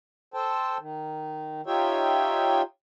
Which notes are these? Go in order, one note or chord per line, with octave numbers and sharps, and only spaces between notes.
A4 C5 G5 A5
D#3
D#4 F4 G4 C#5 E5 G5